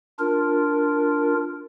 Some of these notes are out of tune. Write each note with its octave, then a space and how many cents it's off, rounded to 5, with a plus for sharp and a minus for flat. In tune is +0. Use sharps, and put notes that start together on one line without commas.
D4 +0 F4 +0 A#4 +0